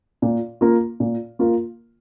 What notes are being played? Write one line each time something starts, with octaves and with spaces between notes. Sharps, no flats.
A#2
A#3 F4 A#4
A#2
A#3 F4 A#4